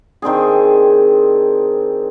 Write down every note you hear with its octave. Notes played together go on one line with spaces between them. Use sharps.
D#3 C4 D4 G#4